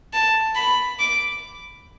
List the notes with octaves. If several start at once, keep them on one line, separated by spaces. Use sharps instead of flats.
A5
B5
D6